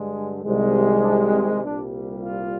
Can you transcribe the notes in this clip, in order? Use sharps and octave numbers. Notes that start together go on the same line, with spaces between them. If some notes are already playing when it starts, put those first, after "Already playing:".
Already playing: G2 D3 G#3
C2 C3 D#3 G#3
D4
C4
C2 A#2 G3 D4
F4